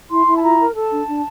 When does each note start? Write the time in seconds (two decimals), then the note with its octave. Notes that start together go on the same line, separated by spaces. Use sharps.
0.10 E4 C6
0.26 E4
0.36 A5
0.42 F4 A#5
0.59 A#4
0.75 A4 A5
0.91 D4
1.08 D4